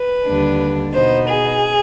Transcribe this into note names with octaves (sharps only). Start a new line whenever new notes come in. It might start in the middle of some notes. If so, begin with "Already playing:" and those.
Already playing: B4
D#2 D3 G3 D4
B2 B3 D#4 C5
G#4